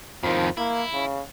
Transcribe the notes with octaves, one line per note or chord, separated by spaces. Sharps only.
F2 D#3 F3
A#3 E4
C#3